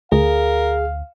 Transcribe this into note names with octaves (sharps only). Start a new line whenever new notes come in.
D2 G#4 A#4 F5